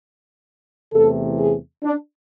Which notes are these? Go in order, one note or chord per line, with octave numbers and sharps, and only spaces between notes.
E2 C3 E3 A3 A4
G#4
D4